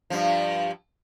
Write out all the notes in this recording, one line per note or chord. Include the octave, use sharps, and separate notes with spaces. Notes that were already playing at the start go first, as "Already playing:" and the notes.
G2 F3